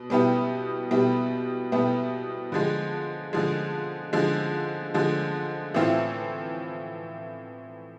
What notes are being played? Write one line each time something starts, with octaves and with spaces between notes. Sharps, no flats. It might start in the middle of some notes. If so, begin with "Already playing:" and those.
Already playing: B2
B2 G3 B3 E4 G4
B2 G3 B3 E4 G4
B2 G3 B3 E4 G4
D3 F3 G#3
D3 F3 G#3
D3 F3 G#3
D3 F3 G#3
A2 E3 A3 C4 F4